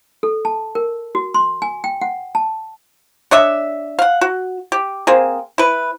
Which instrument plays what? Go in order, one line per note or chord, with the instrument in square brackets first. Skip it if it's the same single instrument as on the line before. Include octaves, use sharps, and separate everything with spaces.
[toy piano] A4
A5
A#4
F#4
C6
G#5
G5
F#5
A5
[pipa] D4 C#5 D#5 E5
F5 F#5
F#4
G4
A#3 C4 G#4
E4 B4